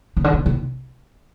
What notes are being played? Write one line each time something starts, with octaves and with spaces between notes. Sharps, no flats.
C#3
D3
C#3
C3